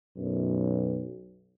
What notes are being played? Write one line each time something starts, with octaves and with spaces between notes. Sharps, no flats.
B1 F#2